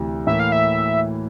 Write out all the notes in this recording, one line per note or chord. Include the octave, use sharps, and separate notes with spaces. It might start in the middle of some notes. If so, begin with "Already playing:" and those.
Already playing: D2 C3 E3
A2 E3 A#3 E5
F5
E5